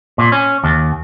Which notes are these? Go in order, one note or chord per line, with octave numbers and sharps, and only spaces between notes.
A#2
C#4
D#2